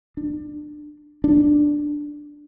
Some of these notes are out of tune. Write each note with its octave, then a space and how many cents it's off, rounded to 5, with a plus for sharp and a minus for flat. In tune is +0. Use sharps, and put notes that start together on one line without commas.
D4 +20
D4 +5